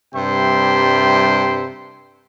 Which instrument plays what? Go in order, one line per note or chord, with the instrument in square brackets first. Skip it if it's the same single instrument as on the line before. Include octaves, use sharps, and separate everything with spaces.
[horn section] G2 C3 G3 E5 G5 C6